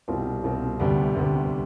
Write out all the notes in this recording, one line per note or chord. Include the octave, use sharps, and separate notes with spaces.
C2 B2 G3 C4 F4
C2 B2 G3 C4 F4
D2 C3 G3 B3
D2 C3 G3 B3